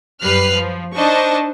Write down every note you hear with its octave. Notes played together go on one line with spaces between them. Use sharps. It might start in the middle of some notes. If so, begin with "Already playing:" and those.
F#2 G3 B4 F6 F#6 C7
F3
D4 D#4 C5 D#5 A5 C#6